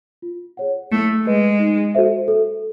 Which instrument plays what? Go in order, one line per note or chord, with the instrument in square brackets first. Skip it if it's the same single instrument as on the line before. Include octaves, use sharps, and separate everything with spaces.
[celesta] F4
G#4 C#5 F#5
[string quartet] A3 [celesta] E4
[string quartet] G#3 [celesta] G#4 B4 D#5
[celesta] D#4
F#4 A4 C5 E5
A4